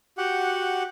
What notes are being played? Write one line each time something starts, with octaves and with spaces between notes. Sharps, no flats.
F#4 G4 F#5